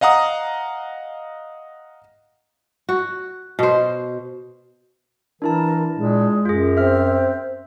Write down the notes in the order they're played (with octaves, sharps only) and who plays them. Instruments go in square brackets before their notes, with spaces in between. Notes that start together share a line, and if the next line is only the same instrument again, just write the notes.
[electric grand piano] D#5 F5 F#5 A#5 D#6
[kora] F#4
B2 C5
[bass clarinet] E3 [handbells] D4 E4 A5 [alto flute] A#4
[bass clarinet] A#2 [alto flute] G#3
[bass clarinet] F#2 [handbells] F4 G#4
[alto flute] C4 [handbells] E5 F6